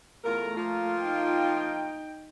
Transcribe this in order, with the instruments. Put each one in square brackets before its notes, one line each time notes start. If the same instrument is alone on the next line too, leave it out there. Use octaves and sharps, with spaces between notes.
[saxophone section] E2 F4 A#4 [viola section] A3 A#5
[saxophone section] F3 A#3 F4
[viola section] D#4 G5